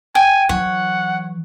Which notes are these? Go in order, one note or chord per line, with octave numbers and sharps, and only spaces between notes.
G5 G#5
E3 F#3 C#5 F#5